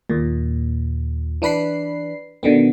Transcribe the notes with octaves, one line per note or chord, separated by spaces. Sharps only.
D#2 A#2
E3 D4 B4 B5 C7
B2 D3 D#3 B3